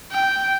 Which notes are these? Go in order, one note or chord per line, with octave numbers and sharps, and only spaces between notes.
G5